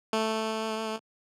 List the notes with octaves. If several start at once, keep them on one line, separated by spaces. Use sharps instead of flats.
A3